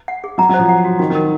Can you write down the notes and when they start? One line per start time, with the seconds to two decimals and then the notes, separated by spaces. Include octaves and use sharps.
0.08 F#5
0.24 G#4
0.38 F#3 A#5
0.49 F#3
0.54 C5
0.59 F3
0.69 F#5
0.84 F#4
0.99 D#3 F#4
1.10 D#3
1.15 A#4